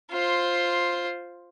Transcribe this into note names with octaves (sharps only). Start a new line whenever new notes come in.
F4 C5